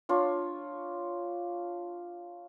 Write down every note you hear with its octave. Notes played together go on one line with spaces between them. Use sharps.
D4 F4 C#5